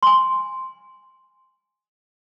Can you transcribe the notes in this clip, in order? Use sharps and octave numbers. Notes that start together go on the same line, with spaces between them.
G#5 C6